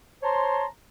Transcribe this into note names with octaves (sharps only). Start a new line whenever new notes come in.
C5 C#5 A5 A#5 C6